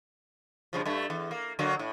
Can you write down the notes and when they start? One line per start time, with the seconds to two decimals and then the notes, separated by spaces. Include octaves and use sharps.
0.73 G2 C#3 F3
0.86 G2 A3
1.10 E2
1.31 A#3
1.59 D3 F#3 A#3
1.79 A2